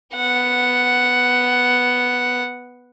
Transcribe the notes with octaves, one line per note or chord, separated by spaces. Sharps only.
B3 F#5